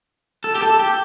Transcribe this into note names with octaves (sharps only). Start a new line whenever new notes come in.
A4
G4
A4
G4